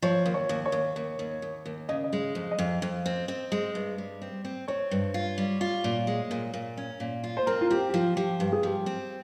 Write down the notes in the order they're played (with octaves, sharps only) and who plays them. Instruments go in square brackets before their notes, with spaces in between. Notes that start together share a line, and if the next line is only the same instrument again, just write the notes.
[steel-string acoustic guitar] F3 [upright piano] C#5
[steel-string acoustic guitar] D#2
[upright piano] C#5
[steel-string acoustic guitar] D#2
[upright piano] C#5
[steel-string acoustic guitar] D#2
D#2
D#2
D#2
D#2
[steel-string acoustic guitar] C#3 [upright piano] D#5
[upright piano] D#5
[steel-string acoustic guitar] G#3
F2
[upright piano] D#5
[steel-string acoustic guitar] F2
F2
C4
C4
G#3
G2
G3
C4
C4
[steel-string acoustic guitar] C4 [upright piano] C#5
[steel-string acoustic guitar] G2
F4
G3
F4
A#2
G#3
A#2
A#2
C#4
A#2
F4
[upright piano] C5
[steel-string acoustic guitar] C4 [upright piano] A#4
[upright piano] F4
[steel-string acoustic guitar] C4 [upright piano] G4
[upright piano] G4
[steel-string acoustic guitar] F3 [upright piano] F4
[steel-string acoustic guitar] F3 [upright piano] G4
[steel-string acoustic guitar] G2 [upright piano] G4
[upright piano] G#4
[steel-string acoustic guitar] F3 [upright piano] G4
[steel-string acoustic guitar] C4